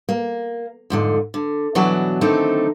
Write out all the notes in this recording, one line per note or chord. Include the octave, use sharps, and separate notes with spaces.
A#3
F2 G#2 D3
D3
B2 E3 F#3 D4 F#4
D3 D#3 F#3 A3 C4 D#4